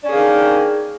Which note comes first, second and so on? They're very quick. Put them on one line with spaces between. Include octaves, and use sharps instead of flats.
D4 C#4 G#4 A#3 D#3